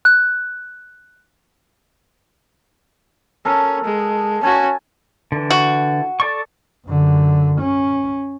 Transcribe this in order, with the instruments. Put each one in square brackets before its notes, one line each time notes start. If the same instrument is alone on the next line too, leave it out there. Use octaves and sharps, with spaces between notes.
[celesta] F#6
[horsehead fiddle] C#4 [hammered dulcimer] A4 A#4
[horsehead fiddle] G#3
[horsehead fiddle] C#4 F#4 [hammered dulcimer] G#5 A5
[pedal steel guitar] D3 E3
[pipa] F#4
[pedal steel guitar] A4 D5 C#6
[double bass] F#2 D3
C#4